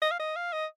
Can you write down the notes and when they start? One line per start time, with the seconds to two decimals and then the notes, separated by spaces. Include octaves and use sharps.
0.02 D#5
0.11 F5
0.19 D#5
0.36 F5
0.53 D#5